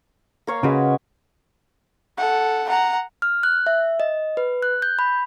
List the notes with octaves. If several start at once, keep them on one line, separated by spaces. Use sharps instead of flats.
A#3 C#5 F5
C#3 G#3 F#4 B4
A4 F#5
F#5 A#5
F6
F#6
E5
D#5
B4
F#6
G6
B5